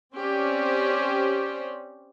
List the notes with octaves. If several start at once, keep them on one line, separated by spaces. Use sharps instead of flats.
C4 C#4 G4 C5 D5